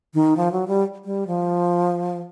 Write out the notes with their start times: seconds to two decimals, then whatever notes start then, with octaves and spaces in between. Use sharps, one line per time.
0.14 D#3
0.37 F3
0.52 F#3
0.68 G3
1.05 G3
1.27 F3